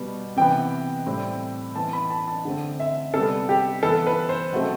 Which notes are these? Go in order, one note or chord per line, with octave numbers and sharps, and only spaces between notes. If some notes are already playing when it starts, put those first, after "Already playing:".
Already playing: B2 G3 B3
C3 E3 B3 G5
A2 G3 C4
E3 B3 A5
B5
A5
A5
D3 A3 C4
E5
C3 G3 B3 A4
G4
E3 B3 A4
B4
C5
B2 F#3 A3 C4